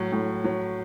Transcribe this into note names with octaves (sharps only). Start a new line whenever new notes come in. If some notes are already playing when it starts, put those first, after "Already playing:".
Already playing: A2 F#3
A2
F#3